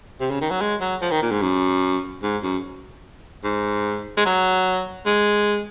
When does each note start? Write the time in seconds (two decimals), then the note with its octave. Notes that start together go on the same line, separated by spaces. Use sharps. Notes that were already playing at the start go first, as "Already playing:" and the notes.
0.20 C3
0.30 C#3
0.41 D#3
0.50 F#3
0.61 G#3
0.81 F#3
1.01 F3
1.11 D#3
1.22 A#2
1.31 G#2
1.42 F#2
2.23 G#2
2.43 F#2
3.44 G#2
4.17 G#3
4.25 F#3
5.06 G#3